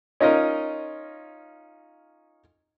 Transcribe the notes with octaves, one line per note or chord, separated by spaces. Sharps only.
C#4 D#4 F4 A#4 D#5